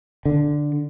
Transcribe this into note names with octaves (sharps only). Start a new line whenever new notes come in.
D3